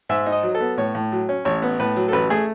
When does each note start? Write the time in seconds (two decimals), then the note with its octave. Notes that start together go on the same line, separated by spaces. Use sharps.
0.09 G#2 E5
0.26 D#4
0.32 D#5
0.43 F#3
0.55 A4
0.60 B3
0.78 A2 C#5
0.95 A2
1.12 F#3
1.29 C#4
1.45 A1 C#5
1.62 B3
1.80 A2 B4
1.96 F#3
2.08 A4
2.12 A1 B4
2.30 A3 G#4